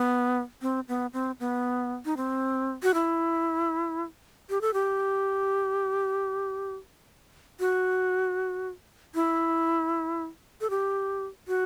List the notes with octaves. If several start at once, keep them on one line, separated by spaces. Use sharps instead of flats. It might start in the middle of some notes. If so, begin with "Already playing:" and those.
Already playing: B3
C4
B3
C4
B3
D#4
C4
F#4
E4
G4
A4
G4
F#4
E4
A4
G4
F#4